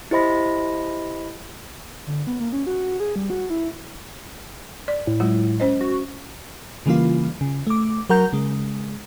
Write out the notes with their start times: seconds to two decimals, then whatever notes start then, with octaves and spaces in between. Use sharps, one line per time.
0.11 E4 G4 C5 D#5 B5 A#6
2.07 D3
2.27 B3
2.40 A#3
2.53 C#4
2.67 F#4
3.00 G#4
3.16 G3
3.30 F#4
3.50 E4
4.88 D5
5.07 A2
5.20 F#3 G#3 F4
5.60 C#4 C5 D#5
5.81 F#4
6.86 C#3 E3 G3 A#3 F4
7.41 C#3
7.67 A3 D6
8.10 F#3 A#4 F#5 A#5 G6
8.33 C#3 G#3